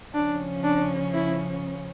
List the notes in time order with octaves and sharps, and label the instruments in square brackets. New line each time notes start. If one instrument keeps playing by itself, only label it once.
[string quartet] C#3 F3 C#4 [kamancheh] D4
[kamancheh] D4
E4